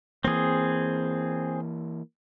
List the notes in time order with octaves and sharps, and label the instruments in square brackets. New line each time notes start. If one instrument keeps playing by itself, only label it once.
[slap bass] E3 A#3 [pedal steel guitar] C4 G#4